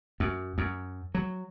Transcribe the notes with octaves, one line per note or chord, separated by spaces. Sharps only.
F#2
F#2
F#3